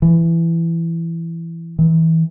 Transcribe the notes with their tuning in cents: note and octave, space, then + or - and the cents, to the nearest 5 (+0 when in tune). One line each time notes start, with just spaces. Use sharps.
E3 +15
E3 -25